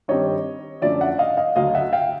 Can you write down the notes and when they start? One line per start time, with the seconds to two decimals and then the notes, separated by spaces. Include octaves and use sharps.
0.08 G2 D#3 G3 C4 C#5 D#5
0.82 F#2 D3 F3 A3 C#4 D5 E5
1.01 E5 F#5
1.19 D#5 F5
1.37 D#5 F5
1.56 D2 D3 F#3 A3 D#5 F5
1.75 E5 F#5
1.93 F5 G5